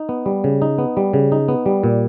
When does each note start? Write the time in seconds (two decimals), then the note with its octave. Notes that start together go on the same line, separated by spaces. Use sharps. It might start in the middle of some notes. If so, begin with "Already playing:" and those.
Already playing: D#4
0.09 B3
0.26 G3
0.44 C#3
0.62 D#4
0.78 B3
0.97 G3
1.13 C#3
1.32 D#4
1.48 B3
1.66 G3
1.84 A#2